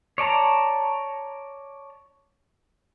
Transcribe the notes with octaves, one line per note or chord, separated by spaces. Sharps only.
C#5 D5 A5 A#5